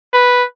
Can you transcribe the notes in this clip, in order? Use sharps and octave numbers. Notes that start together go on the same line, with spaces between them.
B4